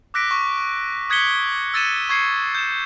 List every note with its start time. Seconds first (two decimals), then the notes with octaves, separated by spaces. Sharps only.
0.14 D6 E6 F#6 A#6 B6 D7
0.31 C#6
1.10 D#6 F#6 G#6 B6 C#7 G7
1.74 E6 G#6 A6 C#7 D#7 E7
2.09 C#6 G#6 C7 C#7 D#7
2.55 G6 E7